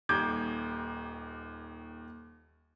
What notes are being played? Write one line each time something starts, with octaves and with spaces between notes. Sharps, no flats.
D#1 D#2 D6 G6 G#6